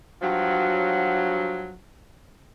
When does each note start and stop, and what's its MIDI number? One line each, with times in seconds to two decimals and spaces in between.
0.21 1.76 43
0.21 1.76 53
0.21 1.76 54